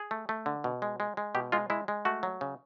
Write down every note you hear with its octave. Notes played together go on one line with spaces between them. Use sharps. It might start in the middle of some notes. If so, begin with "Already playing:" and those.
Already playing: G#4
A3
A3
D3
B2
G#3
G#3
G#3
B2 G4
G#3 F4
G#3 E4
G#3
A3 F#4
F#3
C#3